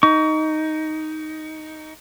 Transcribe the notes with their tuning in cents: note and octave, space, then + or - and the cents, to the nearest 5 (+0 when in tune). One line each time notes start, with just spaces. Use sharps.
D#4 +0 C#6 +35